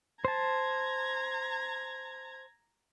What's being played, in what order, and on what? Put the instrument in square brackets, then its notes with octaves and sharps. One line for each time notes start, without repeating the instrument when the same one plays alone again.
[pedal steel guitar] C5 A5 [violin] A#5 G#6